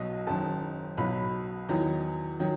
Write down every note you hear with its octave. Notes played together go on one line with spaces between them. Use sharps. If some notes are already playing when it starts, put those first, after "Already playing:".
Already playing: B1 B2 F#3 D#5
F#1 F#2 D#3 A5
B1 B2 F#3 B5
E2 D#3 F#3
D#3 F#3